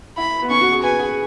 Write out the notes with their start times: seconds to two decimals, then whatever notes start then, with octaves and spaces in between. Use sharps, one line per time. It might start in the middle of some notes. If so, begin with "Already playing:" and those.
0.17 E4 B5
0.42 B3
0.50 C#4 C#6
0.61 F#4
0.72 G#4
0.82 B4 G#5
0.99 G#4